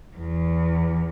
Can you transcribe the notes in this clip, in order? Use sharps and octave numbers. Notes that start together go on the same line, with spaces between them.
E2